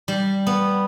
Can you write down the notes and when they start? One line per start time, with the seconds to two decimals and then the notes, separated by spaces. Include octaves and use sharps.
0.08 G3
0.47 B3